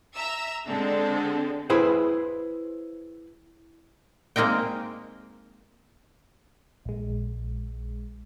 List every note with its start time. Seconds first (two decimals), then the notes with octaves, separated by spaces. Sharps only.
0.15 E5 A#5 E6
0.67 D3 G#3 C4 D4 A4
1.70 E4 G#4 B4 C5
4.36 G#3 A#3 C4 D#4 G5
6.85 A#1 G#3